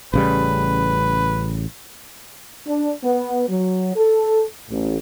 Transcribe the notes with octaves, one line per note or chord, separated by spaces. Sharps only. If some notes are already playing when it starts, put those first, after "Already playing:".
A1 C#3 G3 B4
D4
B3
F#3
A4
A1